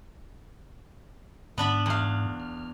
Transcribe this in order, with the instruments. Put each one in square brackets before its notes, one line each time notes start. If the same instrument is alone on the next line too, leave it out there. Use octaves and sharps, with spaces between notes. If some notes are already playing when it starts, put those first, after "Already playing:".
[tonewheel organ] G#2 [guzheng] B3 D4 B5
[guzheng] E2 F5
[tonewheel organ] F6